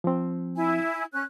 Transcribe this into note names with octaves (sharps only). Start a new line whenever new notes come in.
F3 C4
E4 G#5
C#4 F#6